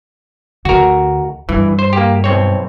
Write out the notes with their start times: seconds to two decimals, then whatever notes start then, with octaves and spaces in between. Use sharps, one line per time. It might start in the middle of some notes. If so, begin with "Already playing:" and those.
0.65 D2 F#4 A#4
1.49 G2 E3
1.79 C5
1.93 A#3 G4
2.24 B1 C4 C#5